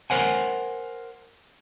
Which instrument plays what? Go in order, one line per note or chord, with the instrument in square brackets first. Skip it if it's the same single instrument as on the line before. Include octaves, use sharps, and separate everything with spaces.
[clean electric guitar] A#4 C5 F#5 G#5